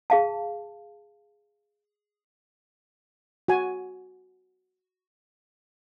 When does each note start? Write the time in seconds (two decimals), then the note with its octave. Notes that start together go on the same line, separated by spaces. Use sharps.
0.10 G#4 F5 A5
3.48 F#4 G#5